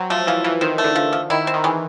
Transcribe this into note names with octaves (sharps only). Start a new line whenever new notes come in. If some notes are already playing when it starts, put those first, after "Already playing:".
Already playing: F#3 C4
F3 A3
E3 F3
E3 F3
D#3 C4
A3
D3
F3
F3
D#3 E4
C4
D#3
E3 G#3